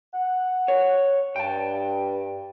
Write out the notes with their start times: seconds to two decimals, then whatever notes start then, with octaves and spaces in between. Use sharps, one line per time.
0.13 F#5
0.68 C#5
1.36 G2 G5 A5